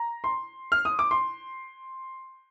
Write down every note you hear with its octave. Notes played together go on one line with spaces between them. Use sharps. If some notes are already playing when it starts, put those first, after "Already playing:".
Already playing: A#5
C6
F6
D#6
D6
C6